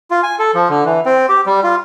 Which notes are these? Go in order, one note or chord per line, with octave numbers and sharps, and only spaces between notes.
F4
G#5
A4
F3
D3
E3
C4
G4
G3
F4